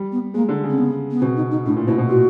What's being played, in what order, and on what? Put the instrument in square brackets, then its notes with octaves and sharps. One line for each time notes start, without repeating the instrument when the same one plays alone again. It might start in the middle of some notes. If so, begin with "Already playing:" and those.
Already playing: [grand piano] G3
[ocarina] B3
[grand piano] G#3 [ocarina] A#3
[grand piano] D3
C#3
[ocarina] C4
B3
B3
[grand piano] B2 [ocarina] C4
[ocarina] D#4
D#4
[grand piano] A2 [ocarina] D4
[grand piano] A#2
[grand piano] B2 [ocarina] E4
[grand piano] B2
[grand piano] A#2 [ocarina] F#4